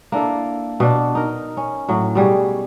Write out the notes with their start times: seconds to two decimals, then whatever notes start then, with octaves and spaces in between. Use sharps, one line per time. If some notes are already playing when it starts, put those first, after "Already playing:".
0.12 A#3 D4 E4 A4
0.80 B2 D4
1.15 D#4 A#4
1.57 C#4
1.89 A2 F#3
2.15 B2 G3 F#4 G#4